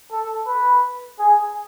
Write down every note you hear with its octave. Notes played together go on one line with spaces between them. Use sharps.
A4
B4
G#4